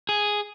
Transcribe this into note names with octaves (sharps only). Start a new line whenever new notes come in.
G#4